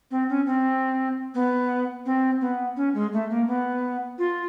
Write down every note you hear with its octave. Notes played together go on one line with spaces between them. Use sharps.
C4
C#4
C4
B3
C4
B3
C#4
G#3
A3
A#3
B3
F4